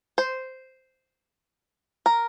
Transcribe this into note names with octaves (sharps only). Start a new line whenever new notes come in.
C5
A#4